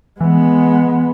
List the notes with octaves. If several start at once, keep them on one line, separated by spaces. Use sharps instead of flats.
E3 G#3 B3